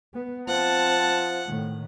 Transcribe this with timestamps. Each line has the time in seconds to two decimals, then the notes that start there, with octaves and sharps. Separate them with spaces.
0.14 B3
0.48 F3 C4 F#5 A5
1.47 A2 D#3